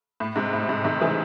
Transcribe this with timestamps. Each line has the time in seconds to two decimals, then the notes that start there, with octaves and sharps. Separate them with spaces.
0.20 A2
0.36 G#2 C3
0.53 A2
0.69 G#2 C3
0.84 C3 D#3
1.01 C#3 E3